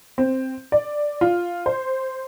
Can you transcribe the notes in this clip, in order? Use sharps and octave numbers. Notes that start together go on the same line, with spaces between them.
C4
D5
F4
C5